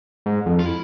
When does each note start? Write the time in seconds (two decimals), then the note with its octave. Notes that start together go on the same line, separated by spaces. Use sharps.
0.26 G#2
0.46 F2
0.59 F4
0.66 E4